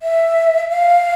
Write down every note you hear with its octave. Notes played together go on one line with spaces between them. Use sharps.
E5
F5